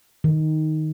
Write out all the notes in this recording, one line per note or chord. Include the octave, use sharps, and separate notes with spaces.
D#3